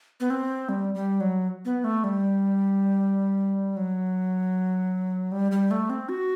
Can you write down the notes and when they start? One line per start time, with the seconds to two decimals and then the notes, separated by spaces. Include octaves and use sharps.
0.20 B3
0.30 C4
0.69 G3
0.95 G3
1.20 F#3
1.65 B3
1.84 A3
2.04 G3
3.77 F#3
5.32 G3
5.52 G3
5.71 A3
5.90 C4
6.09 F#4